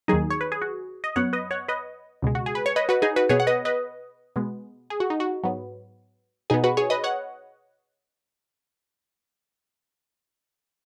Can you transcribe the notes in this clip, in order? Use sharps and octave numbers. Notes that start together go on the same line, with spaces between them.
D#2 D#3 F#3 D#4 G#4
C#5
B4
G#4
F#4
D#5
F#2 F#3 B3 C#5 F#5
B4 D#5
C#5 F#5
B4 D#5
C#2 B2 G#3
F#4
G#4
B4
C#5
B4 D#5
F#4 B4
D#4 G#4
F#4 B4
B2 B3 G#4 C#5
F#5
B4 D#5
B4 D#5
B2 G#3 B3
G#4
F#4
D#4
F#4
G#2 F#3 B3
B2 B3 D#4 G#4
F#4 B4
G#4 C#5
B4 D#5
C#5 F#5